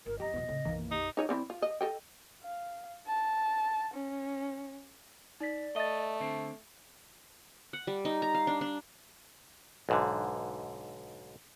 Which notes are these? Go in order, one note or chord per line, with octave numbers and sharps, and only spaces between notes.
G1 A#4
F2 G4 D#5 A#5
E2 B2 F#3 B3
A2 C#3 C4
B1 F#2 D#3 E3 A#3
D#4 G4
D#4 C#5 D#5
E3 C4 D5
F4
D#5
A4 D#5 G5
F5
A5
C#4
D#4 D5 B6
A3 D#5 E5 A6
D3 C4
F#5
G3
D#4
A#5
F5
D4
D4
B1 G#2 D3